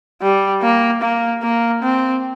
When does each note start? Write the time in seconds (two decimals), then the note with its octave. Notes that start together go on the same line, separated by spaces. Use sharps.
0.22 G3
0.62 A#3
1.02 A#3
1.43 A#3
1.83 C4